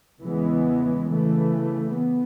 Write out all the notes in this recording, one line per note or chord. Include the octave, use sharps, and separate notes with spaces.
E2 C#3 E3 G#3 B3
C#3 E3 A3
B3